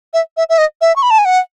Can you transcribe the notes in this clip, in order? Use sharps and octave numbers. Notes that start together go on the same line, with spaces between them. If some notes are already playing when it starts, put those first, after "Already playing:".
E5
E5
E5
D#5
E5
C#6
B5
A5
G#5
F#5